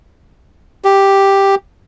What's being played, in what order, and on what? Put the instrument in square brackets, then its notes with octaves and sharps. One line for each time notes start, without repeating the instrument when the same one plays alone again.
[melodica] G4